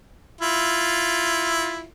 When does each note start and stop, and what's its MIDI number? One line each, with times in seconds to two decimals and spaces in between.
0.41 1.86 64
0.41 1.86 65